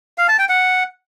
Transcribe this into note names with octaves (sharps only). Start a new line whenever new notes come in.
F5
A5
G5
F#5